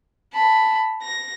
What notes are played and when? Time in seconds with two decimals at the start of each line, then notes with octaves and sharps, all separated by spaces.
0.34 A5 B5
1.03 A#6